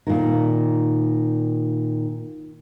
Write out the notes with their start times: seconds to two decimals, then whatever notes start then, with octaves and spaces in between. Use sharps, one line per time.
0.07 A#2 D#3